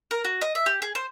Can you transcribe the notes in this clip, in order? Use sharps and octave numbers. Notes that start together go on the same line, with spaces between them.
A#4
F#4
D#5
E5
G4
G#4
C5